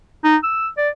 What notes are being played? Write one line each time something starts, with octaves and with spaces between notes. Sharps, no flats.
D#4
E6
D5